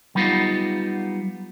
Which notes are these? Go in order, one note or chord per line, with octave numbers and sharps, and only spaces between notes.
F#3 G3 B3 D#4 F4